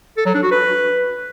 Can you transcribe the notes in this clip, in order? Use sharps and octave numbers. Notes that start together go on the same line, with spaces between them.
A4
F#3
D4
F#4
B4